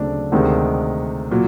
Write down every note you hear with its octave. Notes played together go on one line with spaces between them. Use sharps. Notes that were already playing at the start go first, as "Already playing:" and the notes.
Already playing: D2 C#3 F#3 A3 C4 D4 D5
D2 C3 D#3 G#3 C4
A#2 F#3